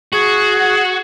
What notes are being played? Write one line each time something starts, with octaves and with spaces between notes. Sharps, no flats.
F#4 G#4